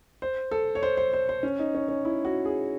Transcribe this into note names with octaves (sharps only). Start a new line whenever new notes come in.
C5
A4
C#5
C5
C5
C5
C5
C#4
D#4
C#4
C#4
E4
F#4
G#4